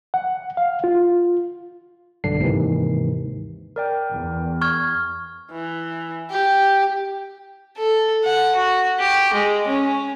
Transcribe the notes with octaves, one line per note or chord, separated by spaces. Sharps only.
F#5
F5
F4
B1 G2 D3 D4 C7
D#2 G#2 C3 D#3 E3
A#4 D5 G5
E2
C#6 F6 G#6
E3
G4
A4
F#5
F#4
G4
G#3
C#4